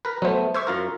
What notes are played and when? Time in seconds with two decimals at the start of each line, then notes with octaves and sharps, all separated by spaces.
0.05 A#4 B4
0.22 F#3 A3 B3 C5
0.54 C5 E5 C#6 E6 G#6
0.67 F#2 F4 A#4